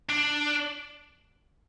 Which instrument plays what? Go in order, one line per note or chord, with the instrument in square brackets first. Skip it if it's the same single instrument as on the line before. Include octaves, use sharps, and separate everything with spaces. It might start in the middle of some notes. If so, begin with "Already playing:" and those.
[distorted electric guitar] D4